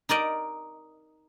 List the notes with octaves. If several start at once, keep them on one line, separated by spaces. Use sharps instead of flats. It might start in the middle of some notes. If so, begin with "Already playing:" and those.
D#4 A#4 D5 D#5